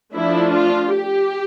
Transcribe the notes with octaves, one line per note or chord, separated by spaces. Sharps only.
F3 A3 D4 E4
F4
G4